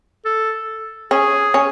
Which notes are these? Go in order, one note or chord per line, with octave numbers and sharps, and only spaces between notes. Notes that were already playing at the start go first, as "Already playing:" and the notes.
A4
C#4 G#4
C#4